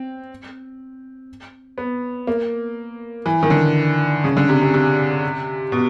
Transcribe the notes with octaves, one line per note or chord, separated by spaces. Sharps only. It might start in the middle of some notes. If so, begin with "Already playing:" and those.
Already playing: C4
B3
A#3
E3
D#3
D3
C#3
D3
C3
C3
C3
B2